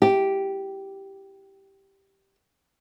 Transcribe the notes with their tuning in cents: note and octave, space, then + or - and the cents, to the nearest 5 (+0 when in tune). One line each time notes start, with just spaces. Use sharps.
G4 -5